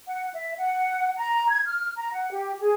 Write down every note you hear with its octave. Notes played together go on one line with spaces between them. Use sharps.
F#5
E5
F#5
A#5
G#6
F6
A#5
F#5
G4
G#4